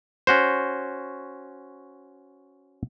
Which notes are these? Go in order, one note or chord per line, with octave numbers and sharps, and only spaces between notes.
C#4 F#4 C5